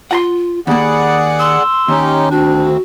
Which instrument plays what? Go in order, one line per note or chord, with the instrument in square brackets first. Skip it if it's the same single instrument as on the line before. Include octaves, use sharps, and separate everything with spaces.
[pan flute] F4 [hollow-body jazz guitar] F#5 A#5 C6
[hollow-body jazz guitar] D#2 A#3 [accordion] G#4 D5 F#5 [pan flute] B5
[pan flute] C6 [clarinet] E6
[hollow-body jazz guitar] D#2 [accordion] C#4 D#4 G4
[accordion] D2 C4 [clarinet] D4 [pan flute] F#4